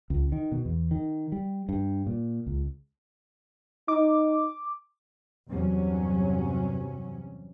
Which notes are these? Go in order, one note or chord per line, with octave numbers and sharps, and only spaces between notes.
C#2
D#3
B2
E2
D#3
G3
G2
A#2
C#2
D#4 D6
E2 G2 C3 F#3 C#4